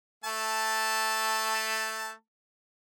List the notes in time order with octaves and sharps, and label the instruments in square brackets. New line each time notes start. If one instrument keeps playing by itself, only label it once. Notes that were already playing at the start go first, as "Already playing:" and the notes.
[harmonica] A3 A5